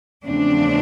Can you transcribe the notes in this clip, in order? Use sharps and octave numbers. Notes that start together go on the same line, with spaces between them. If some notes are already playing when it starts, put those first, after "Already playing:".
E2 C#3 F3 A3 C4 D4